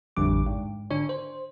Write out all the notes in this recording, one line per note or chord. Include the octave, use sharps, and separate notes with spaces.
A1 F2 D3 G3 D6
G#2
D3 D4 C#5
C5